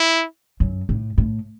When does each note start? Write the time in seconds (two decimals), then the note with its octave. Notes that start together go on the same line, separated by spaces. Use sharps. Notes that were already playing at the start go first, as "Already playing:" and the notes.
Already playing: E4
0.60 F#2
0.89 A2
1.18 A2